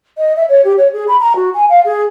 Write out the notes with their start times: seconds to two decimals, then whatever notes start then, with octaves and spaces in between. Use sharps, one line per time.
0.18 D#5
0.37 E5
0.49 C#5
0.64 G4
0.78 C#5
0.93 G#4
1.08 B5
1.20 A#5
1.36 F#4
1.54 G#5
1.69 F5
1.85 G#4